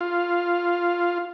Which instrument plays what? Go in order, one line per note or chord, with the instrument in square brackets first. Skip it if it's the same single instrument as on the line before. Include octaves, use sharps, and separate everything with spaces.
[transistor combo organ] F4